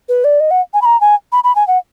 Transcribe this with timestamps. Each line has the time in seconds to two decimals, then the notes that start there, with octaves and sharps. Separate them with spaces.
0.09 B4
0.24 D5
0.40 D#5
0.51 F#5
0.74 G#5
0.82 B5
0.85 A#5
1.01 G#5
1.32 B5
1.44 B5
1.55 G#5
1.68 F#5